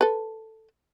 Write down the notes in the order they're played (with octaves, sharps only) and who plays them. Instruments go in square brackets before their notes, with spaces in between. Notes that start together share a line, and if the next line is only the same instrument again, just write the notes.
[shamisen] A4 B4